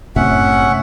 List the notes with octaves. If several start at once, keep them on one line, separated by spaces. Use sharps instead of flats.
F#1 A2 C3 C#4 E5 F#5